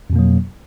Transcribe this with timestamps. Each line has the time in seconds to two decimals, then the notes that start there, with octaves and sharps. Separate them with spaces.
0.10 F2
0.13 B2
0.16 A#3
0.19 F#3